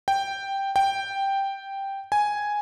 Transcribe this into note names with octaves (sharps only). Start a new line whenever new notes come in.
G5
G5
G#5